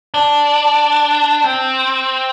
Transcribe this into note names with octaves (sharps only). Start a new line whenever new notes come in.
D4
C4